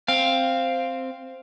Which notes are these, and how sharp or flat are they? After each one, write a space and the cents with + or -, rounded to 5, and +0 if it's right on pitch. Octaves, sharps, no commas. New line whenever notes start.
C4 +0 F5 +0